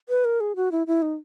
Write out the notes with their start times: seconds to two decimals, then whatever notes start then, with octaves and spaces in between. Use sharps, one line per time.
0.09 B4
0.25 A#4
0.40 G#4
0.56 F#4
0.72 E4
0.87 E4
1.02 D#4